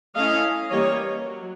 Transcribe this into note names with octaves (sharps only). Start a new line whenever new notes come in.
A3 C#4 E4 D#5 F5
E3 G3 A#3 C#5 D#5
F#3